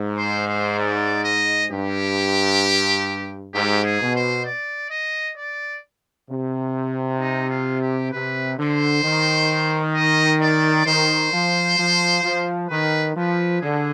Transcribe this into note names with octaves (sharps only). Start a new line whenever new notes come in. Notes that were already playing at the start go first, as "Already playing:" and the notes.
Already playing: G#2
C5
C5
D5
D#5
G2 G4
G#2 G4
G#4
B2
C5
D5
D#5
D5
C3
D#4
F4
G4
C3 B4
D3 C5
D#3
D#5
D5
D#3 C5
F3
F3
F3
D#3 B4
F3 B4
D3 G#4